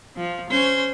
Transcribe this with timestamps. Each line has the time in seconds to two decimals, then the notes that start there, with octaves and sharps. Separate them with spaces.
0.16 F3
0.50 C#4 C5